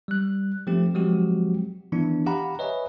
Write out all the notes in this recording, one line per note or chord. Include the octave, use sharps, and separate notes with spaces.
G3 F#6
F3 A3 C4 G4
F3 F#3 G#3 C4 F#4 G4
D#3 E3 B3 D4 E4
G4 F5 F#5 A#5 B5
B4 C#5 D#5 E5 G#5 A#5